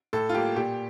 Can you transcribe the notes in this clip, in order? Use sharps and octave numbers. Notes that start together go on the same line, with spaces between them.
A2 A4
F4
G3 A#3 G4
A#2 G4